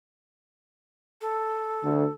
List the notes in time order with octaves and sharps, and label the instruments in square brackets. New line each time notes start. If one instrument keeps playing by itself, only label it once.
[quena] A4
[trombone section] D2